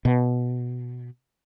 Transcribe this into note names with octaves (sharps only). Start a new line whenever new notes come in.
B2